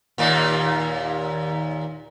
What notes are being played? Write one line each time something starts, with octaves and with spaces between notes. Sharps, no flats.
D#2 A#2 A#3